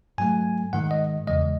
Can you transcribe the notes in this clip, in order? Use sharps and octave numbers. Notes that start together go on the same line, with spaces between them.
G#2 F#3 A3 G#5
G#2 D#3 G#3 F#5
D#5
E2 C#3 E3 G#3 D#5